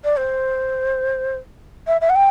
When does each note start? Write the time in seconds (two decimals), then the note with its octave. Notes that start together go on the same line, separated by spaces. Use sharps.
0.04 D5
0.17 C5
1.87 E5
2.01 E5
2.10 F#5
2.16 G5